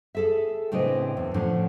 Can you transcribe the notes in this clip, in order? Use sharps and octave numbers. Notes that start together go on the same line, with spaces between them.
G#4 A4 E5
A2 C#3 C4 D4 B4 D#5
E2
A2 D3 F3 C#4 D4